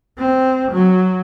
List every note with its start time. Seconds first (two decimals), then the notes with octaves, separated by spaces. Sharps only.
0.18 C4
0.72 F#3